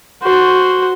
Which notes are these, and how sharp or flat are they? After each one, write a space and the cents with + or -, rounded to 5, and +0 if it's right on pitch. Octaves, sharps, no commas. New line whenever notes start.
F#4 +0 C5 +0